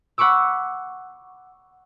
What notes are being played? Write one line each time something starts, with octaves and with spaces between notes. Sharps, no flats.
F#5 B5 C#6 D6 E6